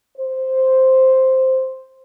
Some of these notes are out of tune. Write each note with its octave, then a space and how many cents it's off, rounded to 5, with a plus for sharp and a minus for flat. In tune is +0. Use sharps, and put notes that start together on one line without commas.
C5 +0